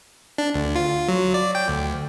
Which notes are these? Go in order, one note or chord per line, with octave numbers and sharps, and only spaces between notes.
D4
D2
F4
F#3
D5
G5
D2